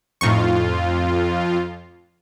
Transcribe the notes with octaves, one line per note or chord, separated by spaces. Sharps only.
F2 A2 D#4 F4 C#6